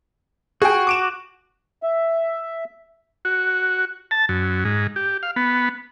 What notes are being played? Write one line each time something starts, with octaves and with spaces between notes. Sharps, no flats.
F#4 G#4 G5
D6 D7 E7
E5
F#4
A5
F#2
G#2
G4
F5
B3